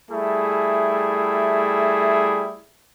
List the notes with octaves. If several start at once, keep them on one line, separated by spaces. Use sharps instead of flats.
G3 A3 E4 G#4